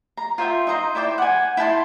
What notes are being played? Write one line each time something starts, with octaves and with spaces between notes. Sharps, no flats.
A#5
F4 C5 E5 G5
D#4 D#5 A#5 C6
E4 C5 D5 G5
F#5 G#5
E4 G5 A5 C6